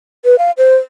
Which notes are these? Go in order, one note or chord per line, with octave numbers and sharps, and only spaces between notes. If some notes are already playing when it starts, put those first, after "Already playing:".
B4
F5
C5